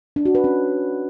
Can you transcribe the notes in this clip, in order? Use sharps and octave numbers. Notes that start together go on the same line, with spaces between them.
D4
F#4
B4
C#4